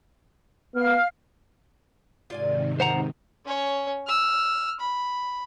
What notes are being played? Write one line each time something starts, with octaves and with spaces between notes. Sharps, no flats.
B3 F5 F6
G#2 C3 D#3 F4 D5 G#5
F3 B3 C5 F#5 A#5
C#4 C#5
E6 F6
B5